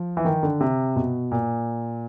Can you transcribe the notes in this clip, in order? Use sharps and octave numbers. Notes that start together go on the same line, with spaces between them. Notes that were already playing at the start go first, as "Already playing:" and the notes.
Already playing: F3
E3
D#3
D3
C3
B2
A#2